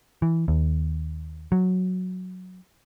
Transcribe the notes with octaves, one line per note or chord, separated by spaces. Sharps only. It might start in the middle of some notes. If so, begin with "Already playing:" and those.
E3
D#2
F#3